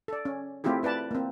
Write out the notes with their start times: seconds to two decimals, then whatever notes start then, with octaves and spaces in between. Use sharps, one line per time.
0.08 A4 D5
0.25 C#4
0.64 A3 C4 E4 F4 G4 G#4
0.83 E4 B4 D5 A5
1.11 A#3 C4